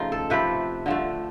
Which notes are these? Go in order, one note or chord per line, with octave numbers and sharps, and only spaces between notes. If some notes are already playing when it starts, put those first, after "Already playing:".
Already playing: C#3 F3 A3 D#4 F4
A4
C3 F3 A3 B4
D3 F3 A3